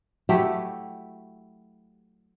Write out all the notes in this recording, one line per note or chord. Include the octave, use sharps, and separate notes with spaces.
F#3 A3 E4 G4